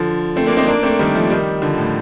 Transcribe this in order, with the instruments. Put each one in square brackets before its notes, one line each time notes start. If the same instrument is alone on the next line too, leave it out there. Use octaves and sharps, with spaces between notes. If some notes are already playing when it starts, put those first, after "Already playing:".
Already playing: [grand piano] D3 F3
A3 C4
A#3 D4
C4 D#4
A#3 D4
A3 C4
D#3 G3
F3 A3
D#3 G3
D3 F3
A2